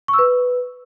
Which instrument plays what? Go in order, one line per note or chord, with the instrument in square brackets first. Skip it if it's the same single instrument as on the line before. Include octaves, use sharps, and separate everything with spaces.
[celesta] C#6
E6
B4